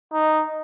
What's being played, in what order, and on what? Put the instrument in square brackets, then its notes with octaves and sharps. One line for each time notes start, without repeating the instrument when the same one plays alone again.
[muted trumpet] D#4